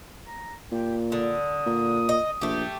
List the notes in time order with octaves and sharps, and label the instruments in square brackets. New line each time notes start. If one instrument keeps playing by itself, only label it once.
[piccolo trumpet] A#5
[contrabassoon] A#2 [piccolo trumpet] G4
[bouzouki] D3 [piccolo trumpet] D#6
[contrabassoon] A#2
[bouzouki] D#5
[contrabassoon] A#1 [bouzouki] A3 G4